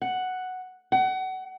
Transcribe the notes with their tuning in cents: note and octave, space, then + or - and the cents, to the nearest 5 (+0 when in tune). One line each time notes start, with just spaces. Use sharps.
F#5 +0
F#5 +30